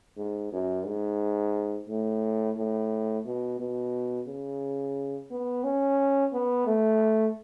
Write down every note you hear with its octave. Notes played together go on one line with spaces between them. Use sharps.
G#2
F#2
G#2
A2
A2
B2
B2
C#3
B3
C#4
B3
A3